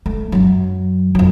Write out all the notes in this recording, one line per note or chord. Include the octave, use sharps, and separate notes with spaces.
A3
F#2 F#3
F2 F#3